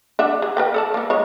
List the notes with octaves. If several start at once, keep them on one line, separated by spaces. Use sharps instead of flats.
D4 E5 F#5
G#4
A#4 B4 G5
A4 D5 A5
A#3 B3
G#3 A#3 C#5